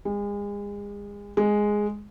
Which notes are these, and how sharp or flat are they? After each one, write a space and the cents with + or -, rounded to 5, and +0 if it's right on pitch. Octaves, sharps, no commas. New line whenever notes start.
G#3 -35
G#3 +0